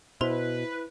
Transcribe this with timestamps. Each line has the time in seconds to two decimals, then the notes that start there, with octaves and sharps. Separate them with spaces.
0.21 B2 E4 B4 C5 C6